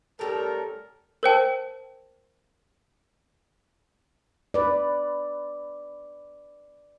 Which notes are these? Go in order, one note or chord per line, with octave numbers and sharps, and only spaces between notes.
A2 G3 C#4 A4 A#4
A#4 C5 G5 A5
B4 D5